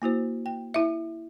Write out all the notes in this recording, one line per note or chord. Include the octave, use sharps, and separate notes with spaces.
A#3 E4 F#4 C5
G5
E4 E5